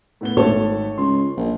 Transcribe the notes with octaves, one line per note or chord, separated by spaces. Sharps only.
A2 B3 G7
G#1 A3 C#5 A5
C#2 C6
A#1